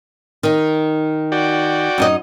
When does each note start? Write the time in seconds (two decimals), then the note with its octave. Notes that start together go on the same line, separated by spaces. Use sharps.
0.43 D#3 D#4
1.32 F#4 D5 G5
1.98 F#2 D#4 D#5